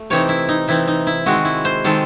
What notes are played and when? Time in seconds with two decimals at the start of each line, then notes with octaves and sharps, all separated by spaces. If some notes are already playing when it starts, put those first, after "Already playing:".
Already playing: A3
0.10 C3 E3 C4 D#4 C#5
0.29 E4
0.49 D#4
0.68 C3 E3 C4 D#4 E4
0.87 D#4
1.07 E4
1.26 D#3 G#3 C4 F#4
1.45 E4
1.65 C5
1.84 D#3 G#3 C4 A4